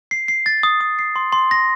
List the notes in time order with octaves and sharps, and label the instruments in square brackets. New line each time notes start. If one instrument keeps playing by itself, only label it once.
[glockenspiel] C7
C7
A6
D#6
D#6
C7
C6
C6
A#6